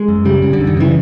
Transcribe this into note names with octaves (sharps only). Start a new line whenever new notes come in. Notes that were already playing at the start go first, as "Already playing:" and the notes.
Already playing: G#3
F#2
C#3 G3
C#3
D3
F#2
D#3
C#3 E3